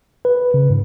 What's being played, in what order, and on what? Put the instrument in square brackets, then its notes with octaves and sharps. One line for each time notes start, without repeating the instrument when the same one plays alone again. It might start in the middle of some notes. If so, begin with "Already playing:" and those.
[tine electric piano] B4
C#3
G#2